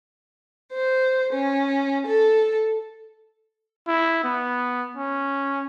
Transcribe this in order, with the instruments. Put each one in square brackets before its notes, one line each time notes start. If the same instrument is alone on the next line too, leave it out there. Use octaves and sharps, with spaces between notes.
[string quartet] C5
C#4
A4
[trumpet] E4
B3
C#4